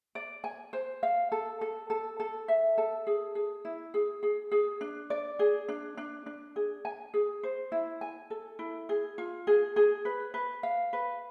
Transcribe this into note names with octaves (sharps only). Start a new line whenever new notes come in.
D5
G#5
C5
F5
A4
A4
A4
A4
E5
A4
G#4
G#4
E4
G#4
G#4
G#4
D4
D5
G#4
D4
D4
D4
G#4
G#5
G#4
C5
E4
G#5
A4
E4
G#4
F4
G#4
G#4
B4
B4
F5
B4